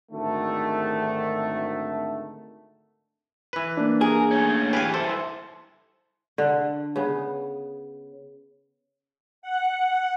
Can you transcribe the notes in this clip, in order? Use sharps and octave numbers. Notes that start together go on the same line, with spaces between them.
G#1 D3 D#3 A3
E3 B4
A#3 D4
G#4 A#4
A3 C#4
E3 G4 B4 F5 G#5
E4 A4 C5
D3
C#3 B3
F#5